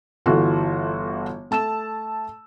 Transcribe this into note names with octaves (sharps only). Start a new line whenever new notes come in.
G1 E3 F4 F#4 A4
A3 A5 E6 E7